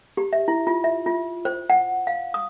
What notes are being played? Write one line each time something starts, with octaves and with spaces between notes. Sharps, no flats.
G4
E5
E4
F4
E5
F4
C5
F#5
F5
D#6